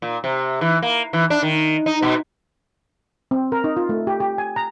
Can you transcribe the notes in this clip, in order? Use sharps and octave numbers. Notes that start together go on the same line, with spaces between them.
A#2
C3
E3
A#3
E3
D4
D#3
D#4
B2
C4
A#4
D#4
F4
A3
G4
G4
G#5
A#5